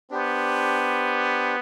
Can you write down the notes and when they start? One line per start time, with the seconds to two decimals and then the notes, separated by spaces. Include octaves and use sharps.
0.11 B3 D4 G4 C5